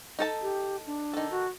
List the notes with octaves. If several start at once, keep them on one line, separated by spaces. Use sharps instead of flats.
D#4 A4 A5
G4
D4
D#3 A4
F#4